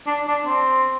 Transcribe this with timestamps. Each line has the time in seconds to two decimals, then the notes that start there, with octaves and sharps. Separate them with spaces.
0.06 D4
0.27 D4
0.46 C4